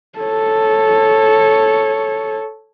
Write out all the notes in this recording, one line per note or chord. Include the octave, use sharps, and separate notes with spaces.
A4 C#5